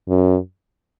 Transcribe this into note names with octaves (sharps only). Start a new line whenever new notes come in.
F#2